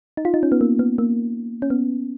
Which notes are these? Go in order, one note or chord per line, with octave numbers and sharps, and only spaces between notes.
D#4
F4
D#4
C#4
B3
A#3
B3
A#3
C#4
B3